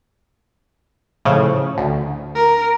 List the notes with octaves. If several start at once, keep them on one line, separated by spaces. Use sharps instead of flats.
A2 C#3 F3
D2
A#4